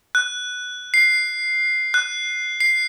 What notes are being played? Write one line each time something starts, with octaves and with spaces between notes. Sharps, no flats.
F#6
C7
F#6
C7